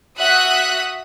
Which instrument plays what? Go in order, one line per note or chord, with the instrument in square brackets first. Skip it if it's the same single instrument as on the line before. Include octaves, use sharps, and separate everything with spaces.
[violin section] F#4 E5 F#5 D#6 F#6